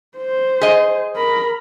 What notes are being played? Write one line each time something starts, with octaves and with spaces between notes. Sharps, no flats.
C5
G#4 D#5
A#4 B5